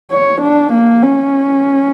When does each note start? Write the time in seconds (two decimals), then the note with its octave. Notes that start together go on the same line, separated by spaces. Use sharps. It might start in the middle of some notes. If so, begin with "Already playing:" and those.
0.11 C#5
0.42 D4
0.73 A#3
1.03 C#4